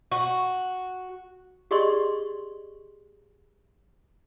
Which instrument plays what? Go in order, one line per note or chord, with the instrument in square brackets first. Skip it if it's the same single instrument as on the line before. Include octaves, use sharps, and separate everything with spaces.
[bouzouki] F#4
[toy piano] G4 G#4 D5 D#5 C6 C#6